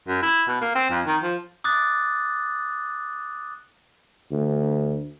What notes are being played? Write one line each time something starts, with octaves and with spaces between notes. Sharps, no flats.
F#2
E4
B2
A#3
C4
F2
D#3
F3
D6 D#6 F#6 A6
D2